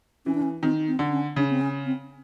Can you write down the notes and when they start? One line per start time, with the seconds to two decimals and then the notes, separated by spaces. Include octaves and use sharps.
0.26 E3 C#4
0.35 D4
0.42 C#4
0.63 D#3 C4
0.88 C4
0.99 D3
1.12 C#4
1.36 C#3 D4
1.50 C4
1.61 C#4
1.86 C4